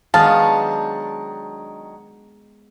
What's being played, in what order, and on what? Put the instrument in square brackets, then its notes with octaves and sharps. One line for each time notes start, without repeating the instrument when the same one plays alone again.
[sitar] D#3 F#3 D4 [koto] G#3 B3 [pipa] F5 [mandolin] A5